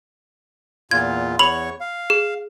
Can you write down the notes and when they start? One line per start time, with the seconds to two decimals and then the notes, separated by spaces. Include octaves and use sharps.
0.91 E2 A#2 F4 G#6
1.39 E2 C#5 B5 C#6 F7 F#7
1.80 F5
2.10 G#4